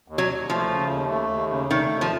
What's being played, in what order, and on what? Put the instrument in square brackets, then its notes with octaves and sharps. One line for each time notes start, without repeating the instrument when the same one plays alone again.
[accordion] D#2
[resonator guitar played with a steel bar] F#3
[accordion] D#2
[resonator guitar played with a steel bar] F3 [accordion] A3
[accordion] C#3
D#2
A3
D#2
C#3
[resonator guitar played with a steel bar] D#3 [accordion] A3
[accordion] D#2
[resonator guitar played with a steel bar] F3